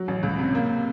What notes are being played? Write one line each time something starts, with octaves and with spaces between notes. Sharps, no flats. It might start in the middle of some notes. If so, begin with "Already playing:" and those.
Already playing: F#3
A1
C#2
C3
A#3